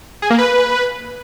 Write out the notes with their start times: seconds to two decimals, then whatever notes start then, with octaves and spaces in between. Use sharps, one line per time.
0.22 G#4
0.30 A#3
0.38 B4